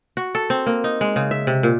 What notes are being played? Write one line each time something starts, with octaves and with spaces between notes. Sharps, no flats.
F#4
A4
C4
A#3
D#4
G#3
C#3
E5
C3
A#2